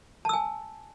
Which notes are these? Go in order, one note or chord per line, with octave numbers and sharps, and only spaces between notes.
G#5 A5 E6